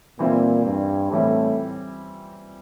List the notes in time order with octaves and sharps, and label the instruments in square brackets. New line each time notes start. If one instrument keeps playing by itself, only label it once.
[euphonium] A#2 [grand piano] E3 G3 C4 E4
[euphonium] G2
[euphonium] A2 [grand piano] E3 G3 C4 E4